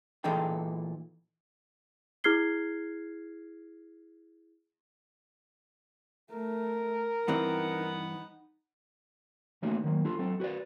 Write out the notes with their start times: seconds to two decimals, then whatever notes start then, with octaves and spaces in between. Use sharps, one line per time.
0.24 A#2 E3 D#4 G#4 A4 G5
2.24 E4 G#4 F6 G#6 C7 G7
6.32 A3 A#4
7.28 G2 E3 B3 C4 D#4 F#5
9.62 E3 A3 A#3 C#4 D#4 F#4
9.84 D#3 F#3 A#3
10.05 D4 F4 A4
10.19 F#3 C4 A4
10.40 F#4 B4 C#5 D5